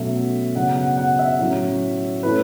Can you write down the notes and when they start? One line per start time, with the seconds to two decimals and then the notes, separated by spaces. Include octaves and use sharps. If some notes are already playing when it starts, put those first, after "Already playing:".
Already playing: B2 F#3 A3 C#4 E5
0.56 C#3 F#3 B3 F#5
0.76 F#5
0.97 F#5
1.19 E5
1.39 A2 F#3 C#4
2.23 A2 E3 A3 C#4 B4